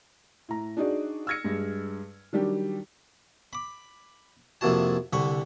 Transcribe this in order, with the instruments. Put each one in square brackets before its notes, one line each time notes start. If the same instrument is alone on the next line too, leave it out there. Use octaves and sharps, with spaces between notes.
[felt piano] A2 A#5
D4 D#4 F#4 G#4 D5
E6 F6 G#6 A#6 C#7
G2 G#3
D#3 F#3 G3 D4 G4
[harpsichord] B5 D6
F2 C3 A#3 E4 F#4 A5
C2 D3 G3 B5 C#6